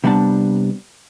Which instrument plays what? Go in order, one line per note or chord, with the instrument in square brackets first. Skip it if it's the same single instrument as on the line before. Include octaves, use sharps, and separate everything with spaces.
[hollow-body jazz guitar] C3 G3 B3 D4 A5